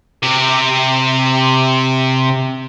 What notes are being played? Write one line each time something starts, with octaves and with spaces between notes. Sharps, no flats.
C3 G4